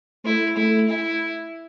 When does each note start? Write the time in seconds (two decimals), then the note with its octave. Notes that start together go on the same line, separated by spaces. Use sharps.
0.24 A3 E4
0.56 A3 E4
0.89 E4